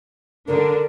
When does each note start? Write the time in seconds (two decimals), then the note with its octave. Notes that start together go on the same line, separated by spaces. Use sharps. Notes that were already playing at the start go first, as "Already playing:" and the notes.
0.47 D3 D4 A#4